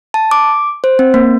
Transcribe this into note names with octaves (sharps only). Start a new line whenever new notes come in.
A5
D6
C5
C4
A#3